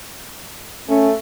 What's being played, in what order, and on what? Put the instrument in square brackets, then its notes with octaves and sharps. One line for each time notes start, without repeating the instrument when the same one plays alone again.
[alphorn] A3 [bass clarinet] C#4